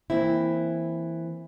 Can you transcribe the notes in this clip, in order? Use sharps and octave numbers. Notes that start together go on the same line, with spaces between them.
E3 A#3 C4 E4